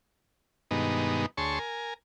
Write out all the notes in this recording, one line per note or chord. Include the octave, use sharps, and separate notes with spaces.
G2 B2 D#3 G#3 B3 D#4
D2 G#4 C#5 A5 C6 C#6
A#4 G#5